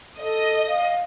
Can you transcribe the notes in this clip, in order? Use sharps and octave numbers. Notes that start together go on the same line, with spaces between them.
A4 D#5
F5